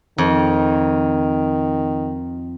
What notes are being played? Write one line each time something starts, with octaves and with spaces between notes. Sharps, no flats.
F2 D#3